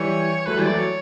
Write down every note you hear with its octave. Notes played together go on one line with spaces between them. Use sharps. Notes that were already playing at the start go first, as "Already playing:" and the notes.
Already playing: E3 G3 C#5
F#3 A3 B4
E3 G3
D5
F#3 A3
C#5